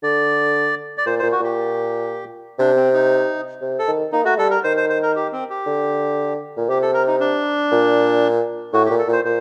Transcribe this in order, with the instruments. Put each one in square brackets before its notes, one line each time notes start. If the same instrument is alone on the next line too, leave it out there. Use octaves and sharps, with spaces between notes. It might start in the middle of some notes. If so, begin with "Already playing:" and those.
[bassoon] D3 [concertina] D5
[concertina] D5
[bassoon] A#2 [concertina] C5
[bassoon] A#2 [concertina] C5
[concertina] F#4
[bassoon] A#2 [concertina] G4
[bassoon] C3 [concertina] D4
[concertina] C4
D#4
[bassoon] C3
[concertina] A4
[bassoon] D#3
[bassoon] A#3 [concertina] D#4
[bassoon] A3 [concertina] F#4
[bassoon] G3 [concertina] A4
[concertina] A#4
[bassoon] D#3 [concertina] C5
[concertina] C5
C5
A#4
G4
C4
G4
[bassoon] D3
A#2
[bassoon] C3 [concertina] G4
[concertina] A4
A#4
D#4
D4
[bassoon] A#2
[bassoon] A2 [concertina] F#4
[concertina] G4
[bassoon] A#2
[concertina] A4
[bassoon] A#2 [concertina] C5
[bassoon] A#2 [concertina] C5